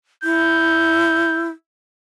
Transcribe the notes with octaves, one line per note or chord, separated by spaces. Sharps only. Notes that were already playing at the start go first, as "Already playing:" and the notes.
E4 G6